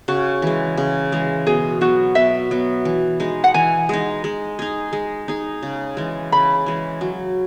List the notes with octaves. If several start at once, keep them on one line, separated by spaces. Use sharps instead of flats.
C#3 F#4
E3 G#3
C#3
E3 G#3
B2 G#4
F#3 B3 F#4
B2 E5
F#3 B3
E3
G#3 D#4
F#5
E3 G#5
G#3 D#4
G#3
D#4 G#4
G#3
D#4 G#4
C#3
E3 G#3
C#3 B5
E3 G#3
F#3